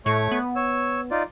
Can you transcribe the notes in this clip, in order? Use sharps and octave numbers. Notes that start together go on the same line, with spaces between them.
A2 A3 C#5 C#6
B3
C#5 E6
D#4 F4 D5